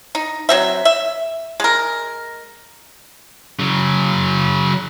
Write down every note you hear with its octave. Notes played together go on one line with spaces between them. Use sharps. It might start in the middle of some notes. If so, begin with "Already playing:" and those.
D#4
F#3 C4 E5
E5
G#3 A#4
C#3 F#3